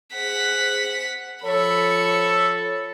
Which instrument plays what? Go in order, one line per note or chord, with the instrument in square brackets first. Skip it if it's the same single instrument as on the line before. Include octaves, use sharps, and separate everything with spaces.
[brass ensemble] G#4 C5 [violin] F#5 B6
[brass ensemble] F3 C#5 [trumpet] A4 [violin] B5 C#6